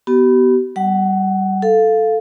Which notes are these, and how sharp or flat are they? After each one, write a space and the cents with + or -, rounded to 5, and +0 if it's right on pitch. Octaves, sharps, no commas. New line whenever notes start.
B3 +0 G4 -40
G3 -20 F#5 +20
A4 +0 F5 +0